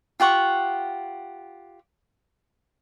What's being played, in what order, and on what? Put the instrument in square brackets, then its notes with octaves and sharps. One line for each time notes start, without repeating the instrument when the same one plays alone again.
[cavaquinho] F4 G4 F#5 C#6